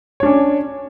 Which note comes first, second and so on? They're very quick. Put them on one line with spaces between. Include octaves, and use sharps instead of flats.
C#5 D4 C#4